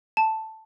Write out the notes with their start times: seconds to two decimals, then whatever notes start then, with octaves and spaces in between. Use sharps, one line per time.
0.17 A5